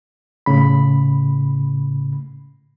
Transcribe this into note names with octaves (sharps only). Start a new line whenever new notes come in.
A2 C#3 B5